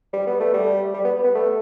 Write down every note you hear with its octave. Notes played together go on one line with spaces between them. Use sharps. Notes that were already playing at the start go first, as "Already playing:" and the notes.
G3
B3
A3
G3
G3
B3
B3
A3